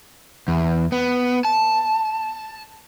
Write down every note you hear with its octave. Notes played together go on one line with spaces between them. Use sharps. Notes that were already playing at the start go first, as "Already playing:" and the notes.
E2
B3
A5